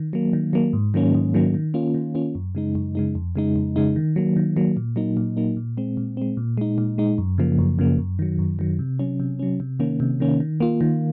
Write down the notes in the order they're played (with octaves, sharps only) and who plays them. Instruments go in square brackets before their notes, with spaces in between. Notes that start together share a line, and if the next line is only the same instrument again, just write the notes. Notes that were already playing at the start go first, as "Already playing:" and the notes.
Already playing: [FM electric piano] D#3
F#3 A#3
D#3
F#3 A#3
G#2
D#3 F#3 A#3 C#4
G#2
D#3 F#3 A#3 C#4
D#3
A#3 C#4 F4
D#3
A#3 C#4 F4
F#2
C#3 G#3 D#4
F#2
C#3 G#3 D#4
F2
C#3 G#3 D#4
F2
C#3 G#3 D#4
D#3
F#3 A#3
D#3
F#3 A#3
A#2
F#3 A#3 D#4
A#2
F#3 A#3 D#4
A#2
G#3 C4
A#2
G#3 C4
A#2
G#3 D#4
A#2
G#3 D#4
F#2
C#3 F3 A#3
F#2
C#3 F3 A#3
F#2
D#3 F#3
F#2
D#3 F#3
C3
F#3 C#4
C3
F#3 C#4
C3
D#3 A#3 C#4
C3
D#3 A#3 C#4
D#3
A#3 F4
D#3